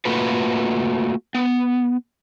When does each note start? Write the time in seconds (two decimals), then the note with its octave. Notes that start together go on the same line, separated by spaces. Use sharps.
0.05 A3 A#3 F4 F#4 A4 B4
1.35 B3